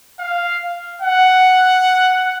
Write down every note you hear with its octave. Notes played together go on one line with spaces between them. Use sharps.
F5
F#5